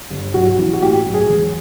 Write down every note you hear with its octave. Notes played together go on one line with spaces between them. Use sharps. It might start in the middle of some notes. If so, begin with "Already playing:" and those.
G1
B1 F#4
E3
F#4
A2 G4
B1
G#4
E1